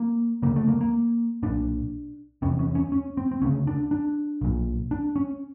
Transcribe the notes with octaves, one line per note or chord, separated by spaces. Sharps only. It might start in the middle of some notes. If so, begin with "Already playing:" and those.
Already playing: A#3
D2 C#3 A#3
A3
A#3
A#3
B1 A#2 D4
E1 E2 C3 C#4
C#4
C#4
C#4
C4
C4
D2 C#3 C#4
D4
D4
B1 A#2
D4
C#4